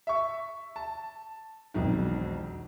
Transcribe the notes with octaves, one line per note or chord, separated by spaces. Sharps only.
E5 C#6
A5
E1 B1 F2 D#3